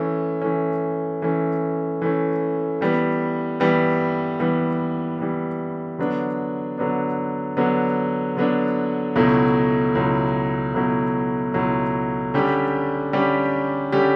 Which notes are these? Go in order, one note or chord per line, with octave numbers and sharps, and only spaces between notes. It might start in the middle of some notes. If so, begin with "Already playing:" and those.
Already playing: E3 A3 C#4
E3 A3 C#4
E3 A3 C#4
E3 A3 C#4
E3 G3 B3
E3 G3 B3
E3 G3 B3
E3 G3 B3
D3 F#3 B3 D4
D3 F#3 B3 D4
D3 F#3 B3 D4
D3 F#3 B3 D4
C#2 B2 F#3 A3 E4
C#2 B2 F#3 A3 E4
C#2 B2 F#3 A3 E4
C#2 B2 F#3 A3 E4
D3 G3 C#4 G4
D3 G3 C#4 G4
D3 G3 C#4 G4